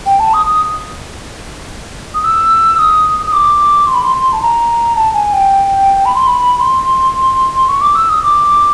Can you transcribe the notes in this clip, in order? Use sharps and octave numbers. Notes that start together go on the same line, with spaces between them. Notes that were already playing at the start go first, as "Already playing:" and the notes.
G5
A5
D#6
D#6
D#6
E6
D#6
D#6
D6
C6
B5
C6
C6
A5
A#5
A5
G#5
G5
B5
C6
B5
C6
C#6
D6
E6
D#6
D6